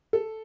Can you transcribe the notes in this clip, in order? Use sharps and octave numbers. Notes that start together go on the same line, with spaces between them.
A4